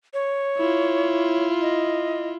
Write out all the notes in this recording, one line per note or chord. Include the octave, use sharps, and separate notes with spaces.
C#5
E4 F4
D#5